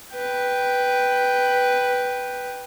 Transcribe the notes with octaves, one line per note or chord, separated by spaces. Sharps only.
B4 G5